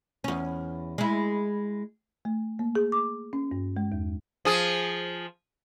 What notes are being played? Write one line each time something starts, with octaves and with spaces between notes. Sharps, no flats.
E2 C#4
G#3 E4
A3
A#3
G#4
D6
C#4
G2
G#3
E2
F3 G#4